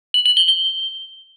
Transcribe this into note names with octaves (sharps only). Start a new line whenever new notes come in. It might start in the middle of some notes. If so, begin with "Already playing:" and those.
F#7
F#7
G7
G7